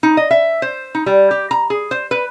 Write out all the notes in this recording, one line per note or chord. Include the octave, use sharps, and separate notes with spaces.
D#4
D#5
E5
C5
D#4
G3
G4
A#5
G#4
C5
B4